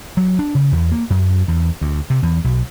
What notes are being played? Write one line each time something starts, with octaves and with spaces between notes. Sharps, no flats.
F#3
D4
C#3
E2
A#3
F#2
E2
D2
C3
E2
B1